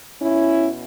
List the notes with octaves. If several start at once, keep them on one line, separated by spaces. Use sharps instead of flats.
B2 C#4 E4